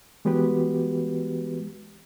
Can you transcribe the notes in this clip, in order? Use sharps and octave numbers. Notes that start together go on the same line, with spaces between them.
E3 G#3 B3 F#4 G4 B4